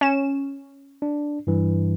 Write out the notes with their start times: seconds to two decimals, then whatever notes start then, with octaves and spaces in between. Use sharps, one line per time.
0.01 C#4 E7
1.02 D4
1.47 G2 E3